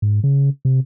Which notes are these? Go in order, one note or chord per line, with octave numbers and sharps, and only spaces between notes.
G#2
C#3
C3